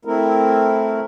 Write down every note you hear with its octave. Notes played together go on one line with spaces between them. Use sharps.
A3 C4 E4 A#4